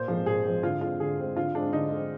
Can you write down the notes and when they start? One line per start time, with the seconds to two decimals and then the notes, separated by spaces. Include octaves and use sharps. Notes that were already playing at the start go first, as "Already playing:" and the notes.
Already playing: A#2 C5
0.08 F3 G#3 C4
0.26 A#2 G#4
0.45 F3 G#3 C4
0.63 D3 F4
0.81 G#3 C4 F4
1.00 D3 G#4
1.19 G#3 C4
1.36 D3 F4
1.55 G#3 C4 D4
1.73 D3 D#4
1.91 G#3 C4